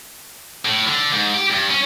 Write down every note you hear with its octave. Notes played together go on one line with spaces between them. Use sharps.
A2
D3
G#2
G4
G2
C#4